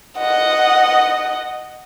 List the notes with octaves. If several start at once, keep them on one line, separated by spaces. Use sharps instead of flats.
D#5 F#5